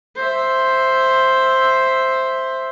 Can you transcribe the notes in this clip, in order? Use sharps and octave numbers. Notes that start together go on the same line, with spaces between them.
C5 E5